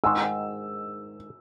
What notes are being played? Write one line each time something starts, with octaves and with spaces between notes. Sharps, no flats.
G#2 D#3 G#3 D#4 E6